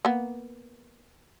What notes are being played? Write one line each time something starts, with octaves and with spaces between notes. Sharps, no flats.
A#3 B3